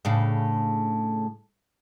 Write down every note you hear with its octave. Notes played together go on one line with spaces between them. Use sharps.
A2 C#3 D4